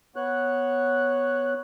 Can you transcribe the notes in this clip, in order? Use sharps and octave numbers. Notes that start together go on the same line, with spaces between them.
B3 C#5 F#6